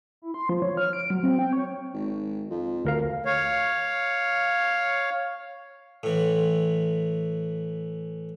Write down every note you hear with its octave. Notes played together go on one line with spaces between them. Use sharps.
E4
C6
F3
C#5
F6
D7
F#3
C4
G5
C#5
G#1
F2
D2 A#4 F5
C#5 F5
A2 E3